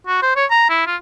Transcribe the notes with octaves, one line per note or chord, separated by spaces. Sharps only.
F#4
C5
C#5
A#5
E4
F4